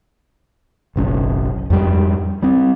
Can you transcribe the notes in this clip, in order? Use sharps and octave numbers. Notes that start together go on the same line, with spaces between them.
F#1 B1 C4 C#4
F2 G#2 G3
G3 C4